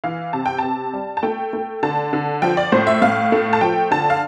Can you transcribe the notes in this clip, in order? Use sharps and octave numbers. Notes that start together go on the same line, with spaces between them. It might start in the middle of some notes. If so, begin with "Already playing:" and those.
E3 F5
C3 A5
G5
C3 A5
G3
A5
A3 G5
A3
D3 A5
D3
F3 G5
D5
A2 C5
E5
A2 F5
A3
A5
F3 G5
D3 A5
F5